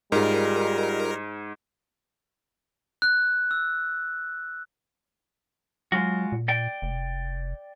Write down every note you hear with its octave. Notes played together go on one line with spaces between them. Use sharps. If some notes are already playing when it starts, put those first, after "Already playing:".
G#2 G3 D#4 F4 G#4 A#4
F#6
E6
F#3 G#3 F4 F#4
A#2
D5 G5
F1